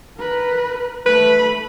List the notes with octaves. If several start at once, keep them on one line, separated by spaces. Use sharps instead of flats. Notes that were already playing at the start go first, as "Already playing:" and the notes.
A#4 B4
A3 B4 B5